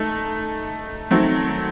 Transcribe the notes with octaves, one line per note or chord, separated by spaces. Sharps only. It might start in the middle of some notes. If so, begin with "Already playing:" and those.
Already playing: A3 D#4 A4
D#3 F#3 A3 C4